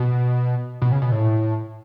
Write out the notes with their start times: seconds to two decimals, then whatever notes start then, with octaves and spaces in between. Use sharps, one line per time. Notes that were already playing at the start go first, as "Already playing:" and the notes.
Already playing: B2
0.82 B2
0.92 C#3
1.02 B2
1.12 A2